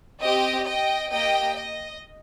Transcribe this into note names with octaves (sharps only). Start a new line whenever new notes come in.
C4 G4 D#5 G5
D#5 G5
A#3 G4 D#5 G5
D#5